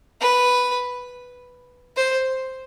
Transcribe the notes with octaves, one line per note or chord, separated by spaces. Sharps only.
B4
C5